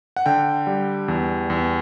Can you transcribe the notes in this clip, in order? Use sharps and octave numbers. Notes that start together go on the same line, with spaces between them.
F#5
D3 G5
G3
E2
E2